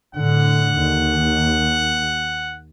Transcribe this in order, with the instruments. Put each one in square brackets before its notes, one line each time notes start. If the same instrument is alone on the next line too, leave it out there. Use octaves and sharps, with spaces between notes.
[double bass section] A2 D3 [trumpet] F#5
[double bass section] D#2